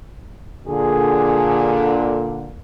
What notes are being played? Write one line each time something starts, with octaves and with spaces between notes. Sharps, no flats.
A#2 D3 G#4